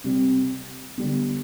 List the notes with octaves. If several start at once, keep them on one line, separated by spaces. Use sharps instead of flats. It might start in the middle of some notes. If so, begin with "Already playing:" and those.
C3 G3 C4
D3 G3 B3